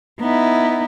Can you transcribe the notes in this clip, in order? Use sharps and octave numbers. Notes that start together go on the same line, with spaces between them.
B3 D#4 E4